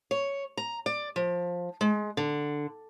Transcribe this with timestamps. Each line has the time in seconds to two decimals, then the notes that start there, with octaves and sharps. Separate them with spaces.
0.11 C#5
0.57 A#5
0.86 D5
1.16 F3
1.81 G#3
2.17 D3